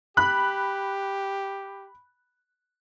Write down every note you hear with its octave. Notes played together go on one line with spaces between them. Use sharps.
G4 B5 F#6